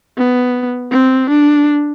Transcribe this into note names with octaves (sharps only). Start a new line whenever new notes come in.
B3
C4
D4